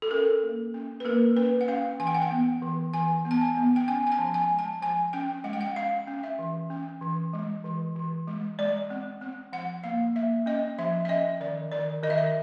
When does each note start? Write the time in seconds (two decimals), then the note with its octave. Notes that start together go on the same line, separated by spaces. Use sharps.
0.02 A4
0.11 C#4 A#4
0.43 A#3
0.74 C#4
1.00 B4
1.05 A#3 A#4
1.36 C#4 B4
1.61 F#5
1.68 C#4 F5
1.99 E3 G#5
2.07 G5
2.15 F#5
2.22 G5
2.31 B3
2.62 E3
2.94 E3 G#5
3.25 B3
3.31 A5
3.41 G#5
3.57 B3
3.76 G5
3.88 C#4 G#5
4.07 G#5
4.12 A5
4.19 F3
4.34 G#5
4.50 G#3
4.59 A5
4.81 F3 G#5
5.13 C#4 G5
5.44 G#3 F#5
5.53 G5
5.61 F#5
5.76 C#4 F5
6.08 C#4
6.23 E5
6.39 E3
6.70 C#4
7.01 E3
7.33 G#3
7.64 E3
7.95 E3
8.27 G#3
8.59 G#3 D5
8.90 C4
9.21 C4
9.53 F3 F#5
9.83 A#3 F5
10.15 A#3 E5
10.46 C#4 D#5
10.78 F3 E5
11.05 E5
11.09 C#4 D#5
11.40 D#3 D5
11.72 D#3 D5
12.03 D#3 D#5
12.10 E5
12.18 D#5